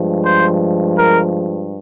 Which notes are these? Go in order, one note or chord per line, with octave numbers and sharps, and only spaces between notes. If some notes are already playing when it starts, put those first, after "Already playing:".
Already playing: G2 F3 G#3
C5
A#4